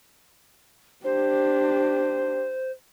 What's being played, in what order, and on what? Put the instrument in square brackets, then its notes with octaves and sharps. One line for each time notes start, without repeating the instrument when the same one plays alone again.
[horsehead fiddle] D4 G4 [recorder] C5